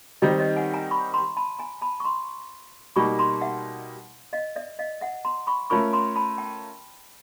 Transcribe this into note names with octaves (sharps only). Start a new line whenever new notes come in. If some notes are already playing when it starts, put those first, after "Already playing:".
D#3 G3 C4 D#4 C#5 D#5
C#5 D#5
F#5 G#5
G#5 A#5
B5 C#6
A#5 C6
A5 B5
G#5 A#5
A5 B5
C#6
A#5 C6
B2 G3 A#3 D#4 B5 C#6
A#5 C6
E5 F#5
D#5 F5
D5 E5
D#5 F5
E5 F#5
A#5 C6
B5 C#6
A3 C#4 F4 A#4 B5 C#6
A#5 C6
A5 B5
G5 A5